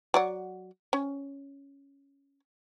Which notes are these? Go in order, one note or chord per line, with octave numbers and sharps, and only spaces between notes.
F#3 D5 F#5
C#4